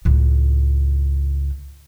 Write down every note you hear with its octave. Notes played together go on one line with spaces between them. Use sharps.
C#2 A2